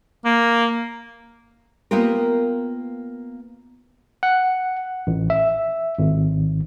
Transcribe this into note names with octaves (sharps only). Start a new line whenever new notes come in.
A#3
A#3 B3 F4 G4 A#4
F#5
A1
E5
G#1